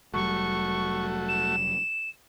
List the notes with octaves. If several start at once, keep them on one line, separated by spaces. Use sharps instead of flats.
F1 F#3 G3 A3 F#4 C#6
E7